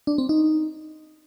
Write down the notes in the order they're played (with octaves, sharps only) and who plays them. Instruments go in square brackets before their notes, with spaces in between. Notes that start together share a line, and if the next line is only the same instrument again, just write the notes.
[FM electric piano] D4
C4
D#4